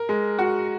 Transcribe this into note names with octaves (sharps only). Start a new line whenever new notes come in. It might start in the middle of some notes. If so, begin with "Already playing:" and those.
Already playing: A#4
G#3
F#4